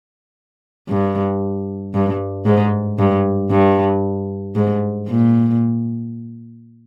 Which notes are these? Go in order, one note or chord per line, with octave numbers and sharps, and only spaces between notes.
G2
G2
G#2
G2
G2
G#2
A#2